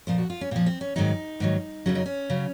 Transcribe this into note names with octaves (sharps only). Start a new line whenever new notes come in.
A#2 F3 C5
F#4
F4
C#4
A#2 F3 C4
C4
C#4
G#2 D#3 F#3 D#4
G#2 D#3 F#3
F#2 C#3 F#3 C#4
D#4
C#4
C#3 F#3